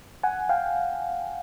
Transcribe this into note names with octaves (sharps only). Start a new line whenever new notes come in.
F#5 G#5
F5 G5